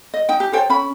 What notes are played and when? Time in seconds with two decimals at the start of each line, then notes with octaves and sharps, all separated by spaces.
0.14 D#5
0.29 D#4 G5
0.40 G4
0.53 A4 C5 C#5 G5
0.70 C#4 B5